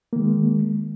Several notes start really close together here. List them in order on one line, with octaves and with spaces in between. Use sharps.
A#3 D#3 G#3